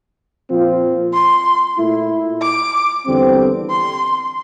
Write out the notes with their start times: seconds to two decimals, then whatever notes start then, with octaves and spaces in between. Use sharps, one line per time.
0.50 A#2 F3 C4 F4
1.14 C6
1.77 A#2 A3 E4
2.42 D6
3.06 E2 D3 G3 C4
3.70 C6